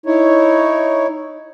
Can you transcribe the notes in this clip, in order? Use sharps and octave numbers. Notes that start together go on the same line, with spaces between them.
D#4 E4 C#5